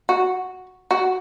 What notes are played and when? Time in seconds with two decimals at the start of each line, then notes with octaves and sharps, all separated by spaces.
0.09 F#4
0.91 F#4